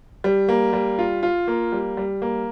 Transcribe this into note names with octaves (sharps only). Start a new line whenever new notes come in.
G3
A#3
G3
F4
F4
A#3
G3
G3
A#3